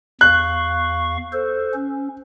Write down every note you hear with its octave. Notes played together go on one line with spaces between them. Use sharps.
E2 F5 C#6 F#6
A4 C5
C#4